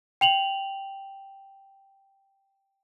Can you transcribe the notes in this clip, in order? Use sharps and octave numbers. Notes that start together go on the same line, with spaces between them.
G5 F7 F#7